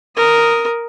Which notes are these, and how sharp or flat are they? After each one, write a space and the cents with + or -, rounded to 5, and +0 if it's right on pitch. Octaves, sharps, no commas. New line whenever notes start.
A#4 +0 D#6 +0